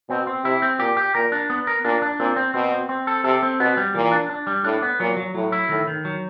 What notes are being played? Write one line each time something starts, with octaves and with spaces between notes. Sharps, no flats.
B2 C4
C4
C3 E4
C4
A#2 G4
G4
A#2 A#4
D4
B3
A#4
A#2 D4
D4
A#2 C4
C4
B2 C4
C4
C4
A4
C3 A4
C4
B2 B3
G3
A#2 E3
D4
D4
G3
A2 D4
B3
A#2 F#3
F#3
A2 F#3
E4
A2 D#3
D#3
F#3